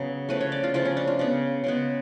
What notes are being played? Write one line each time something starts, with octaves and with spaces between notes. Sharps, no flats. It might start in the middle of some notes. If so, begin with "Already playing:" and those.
Already playing: C#3 F#3 B3 G#4
C#3 F3 A3 B4
C#5
D5
F4
C#3 F3 A3 F4
C#4
D4
F4
C#3 G#3 B3
C#3 G#3 B3